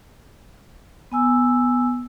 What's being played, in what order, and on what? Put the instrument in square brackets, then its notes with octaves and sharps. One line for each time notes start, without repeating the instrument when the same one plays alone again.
[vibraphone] B3 G#5 E6